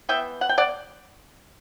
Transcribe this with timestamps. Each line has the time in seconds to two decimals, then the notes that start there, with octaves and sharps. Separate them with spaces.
0.09 E3 B3 E5 G5
0.41 F#5
0.49 G5
0.58 D5 F#5